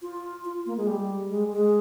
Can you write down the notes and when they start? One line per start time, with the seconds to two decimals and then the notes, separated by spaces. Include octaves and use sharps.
0.02 F4
0.45 F4
0.66 A#3
0.77 G#3
0.87 G3
1.29 G#3
1.52 G#3